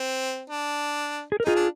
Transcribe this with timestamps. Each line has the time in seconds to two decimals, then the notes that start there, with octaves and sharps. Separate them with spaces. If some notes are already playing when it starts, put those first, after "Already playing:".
Already playing: C4
0.50 D4
1.32 G#4
1.40 A#4
1.44 D#4 F4 G#4
1.56 D4